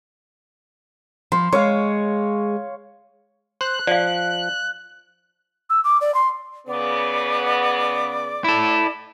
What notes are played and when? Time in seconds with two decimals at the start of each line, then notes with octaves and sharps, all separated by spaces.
1.32 F3 C6
1.53 G#3 C#5 F5
3.61 C5 F#6
3.87 F3 D5 F5
5.70 E6
5.84 D6
6.01 D5
6.15 C6
6.67 C#3 B3 D5
8.44 E4 A4